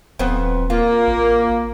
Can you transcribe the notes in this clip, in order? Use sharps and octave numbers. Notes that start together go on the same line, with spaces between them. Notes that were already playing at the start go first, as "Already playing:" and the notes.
D#1 F2 B3 C5
A#3 F4
A1